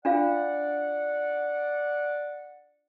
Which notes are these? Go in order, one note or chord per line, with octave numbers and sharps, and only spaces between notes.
D4 F4 D5 F5 F#5